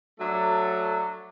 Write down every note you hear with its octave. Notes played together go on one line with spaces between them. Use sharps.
F#3 A3 D4